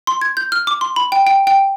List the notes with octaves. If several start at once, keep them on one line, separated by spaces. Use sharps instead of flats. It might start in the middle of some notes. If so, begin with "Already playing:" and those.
C6
G#6
G6
F6
D6
C6
B5
G5
G5
G5